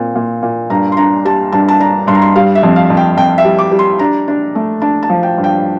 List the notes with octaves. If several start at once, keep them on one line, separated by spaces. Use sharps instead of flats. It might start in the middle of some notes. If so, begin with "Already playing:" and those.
Already playing: A#2 C4
A#2
A#2
G2 A#5
C6
D4 A#5
G3 A5
G2 A5
A5
D4 A#5
G2 C6
A#5
C6
G3 F5
E5
F2
F5
F2
G5
F2 G5
E5
G3
D6
G3
C6
D4 A#5
D4
A3
D4 A5
A5
F3
G5
G2
G5